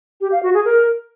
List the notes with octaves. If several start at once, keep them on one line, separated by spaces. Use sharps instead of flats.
G4
F5
F#4
G#4
A#4